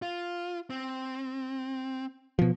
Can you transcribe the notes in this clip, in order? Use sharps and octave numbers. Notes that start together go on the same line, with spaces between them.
F4
C4
B2 F3